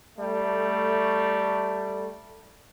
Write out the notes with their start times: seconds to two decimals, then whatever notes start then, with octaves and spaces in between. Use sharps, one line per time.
0.18 G3 A3